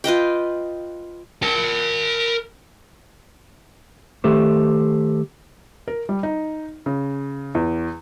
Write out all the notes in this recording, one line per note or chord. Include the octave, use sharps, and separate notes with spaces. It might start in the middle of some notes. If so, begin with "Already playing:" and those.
F4 B4 D#5 G5
A#4 A5
D#3 A3 G4 A4 C5
A#4
G3
D#4
C#3
E2